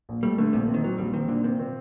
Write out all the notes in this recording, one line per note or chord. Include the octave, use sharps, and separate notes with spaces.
A#1
G3 A3
D3 A3
A#1 C3
C4
D#3
F#3 C4
A#1 G3
D#3 C4
A#2 D3
C3 C4
C4